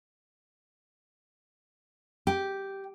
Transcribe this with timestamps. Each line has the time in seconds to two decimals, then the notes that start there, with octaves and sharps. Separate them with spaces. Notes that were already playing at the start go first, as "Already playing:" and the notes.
2.27 G4